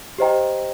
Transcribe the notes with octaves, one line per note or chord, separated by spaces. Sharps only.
G4 C5 D#5 G5 A#5